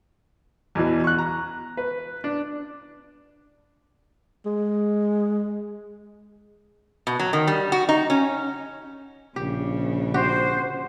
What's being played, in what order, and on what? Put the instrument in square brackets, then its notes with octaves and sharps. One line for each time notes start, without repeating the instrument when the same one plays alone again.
[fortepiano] E2 B2 E3
C#6 F#6
A#5
B4
D4
[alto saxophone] G#3
[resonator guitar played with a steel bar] B2
F#3
D#3
G3
F#4
D#4
C#4
[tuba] A#1 [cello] C#3 [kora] G4
[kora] F#4 G4 [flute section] C5